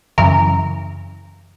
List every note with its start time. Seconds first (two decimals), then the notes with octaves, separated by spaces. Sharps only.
0.18 F#2 C#3 E3 A#4